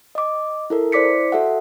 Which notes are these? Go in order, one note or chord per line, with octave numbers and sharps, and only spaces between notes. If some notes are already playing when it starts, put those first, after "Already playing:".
D#5 D6
E4 A4 A#4
E4 C5 D5 D6 B6 C#7
F#4 A4 E5 F#5